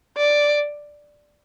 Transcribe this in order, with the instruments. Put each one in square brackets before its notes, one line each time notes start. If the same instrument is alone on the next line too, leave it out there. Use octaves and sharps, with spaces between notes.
[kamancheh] D5